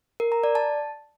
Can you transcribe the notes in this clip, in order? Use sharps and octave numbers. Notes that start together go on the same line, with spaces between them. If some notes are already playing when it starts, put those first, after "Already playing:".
A#4
A#5
D5
A5